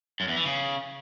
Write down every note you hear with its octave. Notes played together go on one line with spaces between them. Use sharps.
F#2
E2
E3
C#3